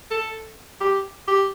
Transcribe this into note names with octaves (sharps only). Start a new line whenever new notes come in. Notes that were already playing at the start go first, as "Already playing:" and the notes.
A4
G4
G4